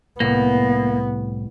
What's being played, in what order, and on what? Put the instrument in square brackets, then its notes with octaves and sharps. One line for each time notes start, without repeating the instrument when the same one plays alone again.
[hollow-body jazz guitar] C2 A2 [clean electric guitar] A#3 [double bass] B3